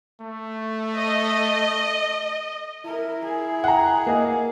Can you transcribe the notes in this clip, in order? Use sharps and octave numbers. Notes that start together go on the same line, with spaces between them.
A3
D#5
E4 A#4
G#4
F#5 G5 A#5
A#3 D#5